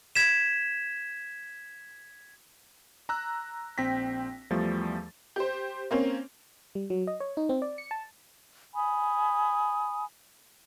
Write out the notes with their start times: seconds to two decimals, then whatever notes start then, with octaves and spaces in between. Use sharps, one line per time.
0.15 G#6 B6 E7
3.09 A#5 E6 F#6
3.78 A#1 C4 G5 A#6 B6
4.50 E2 F3 G3 A3 A6
5.36 G4 C5
5.91 A#3 C4 C#4
6.75 G3
6.90 F#3
7.07 D#5
7.20 C#5
7.37 D#4
7.49 C4
7.62 D5
7.78 C#7
7.91 A5
8.75 G#5 B5 D#6